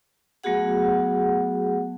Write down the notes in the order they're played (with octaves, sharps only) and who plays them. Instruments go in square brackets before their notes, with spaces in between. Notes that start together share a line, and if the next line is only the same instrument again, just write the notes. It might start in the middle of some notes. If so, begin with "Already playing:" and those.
[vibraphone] F#3 A3 B3 F#4 G#4 F#5